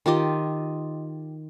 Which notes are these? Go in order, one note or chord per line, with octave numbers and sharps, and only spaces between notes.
D#3 F4 G4 D#5